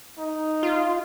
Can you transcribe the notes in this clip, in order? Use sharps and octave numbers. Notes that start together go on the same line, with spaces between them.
D#4
F4